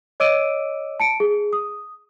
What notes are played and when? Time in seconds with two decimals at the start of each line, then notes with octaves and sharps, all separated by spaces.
0.20 C#5 D#5 D6 E6 D7 D#7
1.00 A5 C#7 D7
1.20 G#4
1.53 D#6